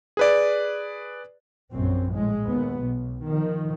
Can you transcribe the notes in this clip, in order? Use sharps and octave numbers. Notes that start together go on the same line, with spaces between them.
G#4 B4 D5
A#1 F#2 C4
A2 G#3
D#2 B3
B1
D#3 F3